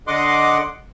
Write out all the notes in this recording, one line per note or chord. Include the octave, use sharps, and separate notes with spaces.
D3 D#5 F#5 C6 D6